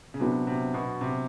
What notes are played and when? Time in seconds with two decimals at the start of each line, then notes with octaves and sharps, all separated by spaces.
0.14 C#3
0.20 C3 F#3 B3 D4
0.47 C3
0.74 B2
1.01 C3